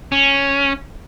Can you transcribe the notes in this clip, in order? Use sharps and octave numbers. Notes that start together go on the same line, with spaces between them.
C#4